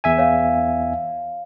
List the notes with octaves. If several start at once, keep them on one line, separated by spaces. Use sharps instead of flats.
E2 E5 G#5
C#5 F5